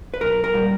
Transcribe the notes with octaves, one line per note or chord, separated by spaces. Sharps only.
B4
B1 A#4
A#4
A#2 G3